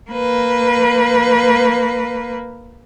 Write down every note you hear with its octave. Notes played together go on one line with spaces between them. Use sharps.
A#3 B4